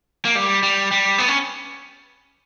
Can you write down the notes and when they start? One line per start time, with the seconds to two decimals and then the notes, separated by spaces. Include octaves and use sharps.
0.25 A#3
0.35 G3
0.63 G3
0.91 G3
1.18 B3
1.28 C#4